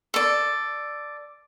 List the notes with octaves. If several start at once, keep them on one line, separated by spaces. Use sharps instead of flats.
A4 D5